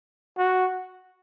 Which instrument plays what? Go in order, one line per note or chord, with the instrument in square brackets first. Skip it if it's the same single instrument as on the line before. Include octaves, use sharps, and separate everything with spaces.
[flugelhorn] F#4